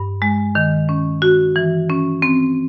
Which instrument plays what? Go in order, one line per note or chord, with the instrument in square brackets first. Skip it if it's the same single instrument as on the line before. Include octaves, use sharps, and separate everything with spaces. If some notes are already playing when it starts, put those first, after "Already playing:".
Already playing: [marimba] G2
G#3
D#3
C#4
F#4
E3
C#4
C4